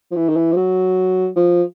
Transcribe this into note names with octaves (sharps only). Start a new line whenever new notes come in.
F3
E3
D#3
E3
F3
F#3
F3